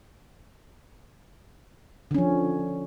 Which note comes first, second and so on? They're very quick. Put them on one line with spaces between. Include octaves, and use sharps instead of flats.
D3 C#4 F3